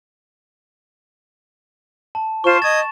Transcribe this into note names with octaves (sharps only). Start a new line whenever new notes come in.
A5
F4 C5 C6 C#6 E7
D#5 D#6 G#6 A6